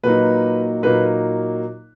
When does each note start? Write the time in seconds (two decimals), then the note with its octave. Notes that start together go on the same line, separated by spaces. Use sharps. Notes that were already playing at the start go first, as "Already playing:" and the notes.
0.04 A#2 F#3 A#3 D#4 B4
0.83 A#2 F#3 A#3 D#4 B4